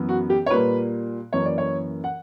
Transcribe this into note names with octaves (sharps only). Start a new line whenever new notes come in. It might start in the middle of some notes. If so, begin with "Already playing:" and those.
Already playing: F#2 E3 B3
F#4
G4
C#5
A#2 G3 A#3 B4
F#2 E3 A#3 C#5
D5
C#5
F#5